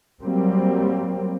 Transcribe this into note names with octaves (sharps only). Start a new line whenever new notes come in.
F#3 G3 A#3 C4